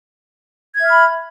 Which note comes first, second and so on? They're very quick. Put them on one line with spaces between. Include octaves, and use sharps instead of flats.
G#6 E5 F6 B5